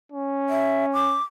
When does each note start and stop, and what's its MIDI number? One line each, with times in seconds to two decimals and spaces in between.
0.12 1.17 61
0.49 0.86 76
0.94 1.23 86